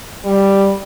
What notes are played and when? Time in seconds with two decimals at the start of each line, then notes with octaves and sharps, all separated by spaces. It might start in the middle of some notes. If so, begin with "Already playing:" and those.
0.25 G3